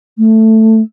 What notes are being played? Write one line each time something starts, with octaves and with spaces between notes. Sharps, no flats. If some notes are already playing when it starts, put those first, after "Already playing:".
A3